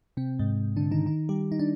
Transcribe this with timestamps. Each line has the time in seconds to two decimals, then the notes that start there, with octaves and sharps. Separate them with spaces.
0.17 C3 C4
0.39 G#2 G#3
0.76 D3 D4
0.91 D#3 D#4
1.06 D#3 D#4
1.29 G3 G4
1.52 D#4
1.59 D4